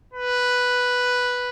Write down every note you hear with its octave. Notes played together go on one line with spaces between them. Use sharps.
B4